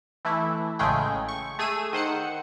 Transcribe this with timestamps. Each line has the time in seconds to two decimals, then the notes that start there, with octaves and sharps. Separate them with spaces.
0.25 E3 A3 E4
0.79 A1 C#3 G#3 A3 G#4 G5
1.29 C#6
1.59 A3 G#4 D#6 E6 D#7
1.93 D#3 C5 F#5 C#7